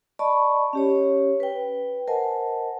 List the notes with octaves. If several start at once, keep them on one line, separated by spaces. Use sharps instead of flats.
D5 D#5 A5 B5 C#6
C#4 G4 C#5
B4 G5
A#4 C5 D#5 F#5 G#5 A5